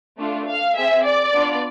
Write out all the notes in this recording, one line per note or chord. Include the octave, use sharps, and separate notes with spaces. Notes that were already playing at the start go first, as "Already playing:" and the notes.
A3 D4 F4
F5
C4 G#4 E5
D5
B3 D4 F4